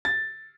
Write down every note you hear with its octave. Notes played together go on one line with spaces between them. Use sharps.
A6